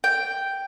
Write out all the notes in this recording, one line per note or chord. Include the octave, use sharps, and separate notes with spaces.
G5